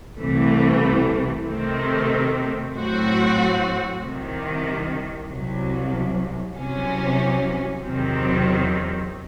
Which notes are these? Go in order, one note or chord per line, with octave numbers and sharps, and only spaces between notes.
C2 C3 E3 A3
C3 D#3 A3 C4
A2 F#3 C4 F#4
C2 C3 D#3
C2 C3 F#3
C2 C3 F#3 C#4
E2 C3 D#3 F#3 C4